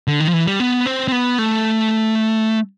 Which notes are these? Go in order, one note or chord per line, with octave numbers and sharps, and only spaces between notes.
D3
D#3
F3
E3
G3
B3
C4
C4
B3
A3